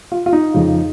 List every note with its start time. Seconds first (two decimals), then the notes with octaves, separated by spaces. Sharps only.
0.12 F4
0.26 F4
0.33 D#4
0.54 F2 C#3 F3